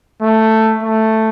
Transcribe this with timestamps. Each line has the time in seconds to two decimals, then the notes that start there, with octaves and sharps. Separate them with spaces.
0.22 A3
0.83 A3